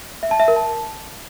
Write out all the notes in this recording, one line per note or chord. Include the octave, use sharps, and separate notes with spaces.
E5
A5
E5
A#4
A5